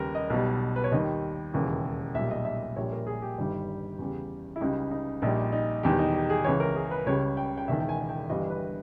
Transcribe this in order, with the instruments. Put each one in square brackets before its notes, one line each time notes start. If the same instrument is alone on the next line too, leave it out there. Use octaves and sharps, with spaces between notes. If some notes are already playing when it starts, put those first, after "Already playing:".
Already playing: [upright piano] D#2 C#3 G3 A#4 B4
D#5
B1 B2 G3
B4
C#5
D#2 D#3 G3 D#5
E1 D#2 C#3 E3
B1 A#2 G3 E5
D#5
E5
A#1 A#2 G3 C#5
A#4
G#4
G4
G1 G2 D#3 G3
E2 C#3 G3
E4
C#2 C#3 G3 D#4
D#4
A#1 A#2 G3 D#4
D#4
E1 E2 D#3 G3 G4
D#4
G4
G#4
C#2 C#3 E3 C#5
A#4
G#4
B4
C#2 C#3 G3 C#5
G5
G5
E1 E2 D#3 E5
G5
G#5
G5
G1 G2 E3 G3 D#5
B4